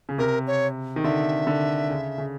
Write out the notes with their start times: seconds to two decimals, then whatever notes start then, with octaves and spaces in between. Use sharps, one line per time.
0.09 C#3
0.18 C3 A#4
0.47 C#5
0.96 D#3
1.04 D3 E5
1.47 D3
1.90 C#3
2.18 C#3